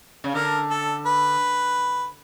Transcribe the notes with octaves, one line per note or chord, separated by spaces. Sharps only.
C#3
D3 A#4
A4
B4